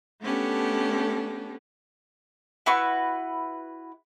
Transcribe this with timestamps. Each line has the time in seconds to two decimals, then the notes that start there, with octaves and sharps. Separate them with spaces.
0.22 A3 B3 C#4 D4 G4 A4
2.66 E4 F#4 B4 C#6